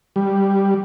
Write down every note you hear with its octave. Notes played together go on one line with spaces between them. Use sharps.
G3